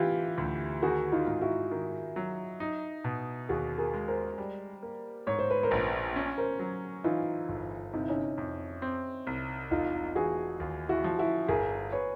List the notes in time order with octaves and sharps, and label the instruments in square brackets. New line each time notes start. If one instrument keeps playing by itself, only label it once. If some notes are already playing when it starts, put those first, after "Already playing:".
Already playing: [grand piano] E3 [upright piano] E4 F4 G4
[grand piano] D2
[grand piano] D#3 [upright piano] F#4 G#4
[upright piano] D#4 F4
[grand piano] G#2
[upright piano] E4 F#4
[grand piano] D#3
F#3
D#4
B2
[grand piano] D#2 [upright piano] F#4 G#4
[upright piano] G#4 A#4
[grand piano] G#3
[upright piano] A#4 C5
[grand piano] G3
A#3
[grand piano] G#2 [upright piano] C#5
[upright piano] C5
B4
A#4 C5
[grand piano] A#1
C#4
[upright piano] A#4 C5
[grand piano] F#3
[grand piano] E3 [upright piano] D#4 F4
[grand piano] G1
[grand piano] C3 [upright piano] D#4
[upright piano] E4
C#4 D#4
[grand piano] F2
C4
C2
[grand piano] E1 [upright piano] D#4 F4
[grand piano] E3 [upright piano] F#4 G#4
[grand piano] D#2
[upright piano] E4 F#4
[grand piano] F3
[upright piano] E4 F#4
[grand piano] G1 [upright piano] G#4 A#4
[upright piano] B4 C#5